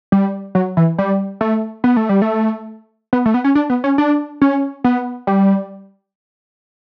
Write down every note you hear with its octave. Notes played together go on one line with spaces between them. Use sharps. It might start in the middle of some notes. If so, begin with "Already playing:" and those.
G3
F#3
E3
G3
A3
B3
A3
G3
A3
B3
A3
B3
C#4
D4
B3
C#4
D4
C#4
B3
G3